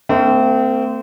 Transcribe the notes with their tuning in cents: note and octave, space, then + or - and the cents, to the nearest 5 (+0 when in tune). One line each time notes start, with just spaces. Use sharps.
A3 +40 C4 -25